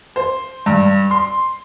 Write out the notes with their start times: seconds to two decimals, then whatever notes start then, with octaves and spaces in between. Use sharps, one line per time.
0.16 C5
0.66 G2
1.11 C6